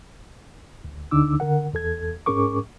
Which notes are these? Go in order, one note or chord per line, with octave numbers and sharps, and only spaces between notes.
D2
D2 D3 D4 D#4 D6 E6
D3 A#4 F#5
E2 A4 G#6
G#2 C#4 G#4 A#4 C#6 D6